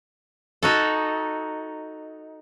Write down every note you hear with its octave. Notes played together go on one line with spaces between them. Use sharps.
D#4 F#4 A4